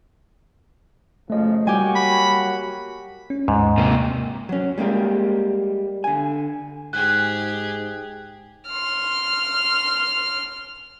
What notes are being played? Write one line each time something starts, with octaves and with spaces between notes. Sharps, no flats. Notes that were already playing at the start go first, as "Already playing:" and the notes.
F#2 C#3 F3 A3 D#5
F#3 G3 A#3 F#4 G4 G5 G#5
B5
C#4
D#2 G#2 G#3
C3 A#3
F#3 C#4
G3 G#3 A#3 G4 A#4
D3 G#5
G#2 G4 G#4 F#6
C6 F6